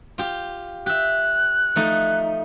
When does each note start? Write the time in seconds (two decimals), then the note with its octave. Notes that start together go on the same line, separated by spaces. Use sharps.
0.18 F4 G4
0.86 G4 E5 F#6
1.76 F3 A3 D#4